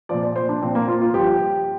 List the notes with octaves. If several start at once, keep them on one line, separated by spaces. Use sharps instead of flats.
A#2 F3 D5
D5
C5
D4
A#2 F3 C4
A#3
F4
F4
G2 F3 G4